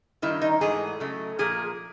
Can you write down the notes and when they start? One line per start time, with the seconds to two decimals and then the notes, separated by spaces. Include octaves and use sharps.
0.22 G2 D#3 G3 A#3 E4
0.42 D#4
0.61 G#2 E3 A3 G#4
1.00 C#3 F#3 A3
1.39 A#2 F3 A#3 G#4